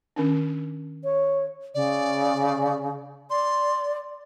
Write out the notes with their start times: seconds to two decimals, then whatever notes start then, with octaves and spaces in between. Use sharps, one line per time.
0.16 D#3 C#4 D4
1.04 C#5
1.74 C#3 D5
3.30 D5 C6